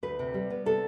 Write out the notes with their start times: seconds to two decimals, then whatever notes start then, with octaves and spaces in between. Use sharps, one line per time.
0.03 D2 B4
0.19 C3
0.34 G3
0.50 B3
0.66 C3 A4